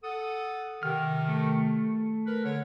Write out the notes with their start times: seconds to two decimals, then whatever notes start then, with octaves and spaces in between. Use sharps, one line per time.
0.03 A4 F#5 D#6
0.83 C3 D#3 F6
1.28 A3
2.26 A#4 B4
2.45 D3 C#5